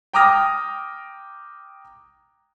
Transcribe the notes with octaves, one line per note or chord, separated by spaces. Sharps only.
G5 A#5 D6 D#6 F6 A#6